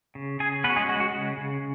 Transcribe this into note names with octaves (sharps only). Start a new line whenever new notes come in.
C#3
C#3 G#4 G#5
B3 C#4 B4
F#4
G#3 G#4
G#3 F#4
F#4
C#3
C#3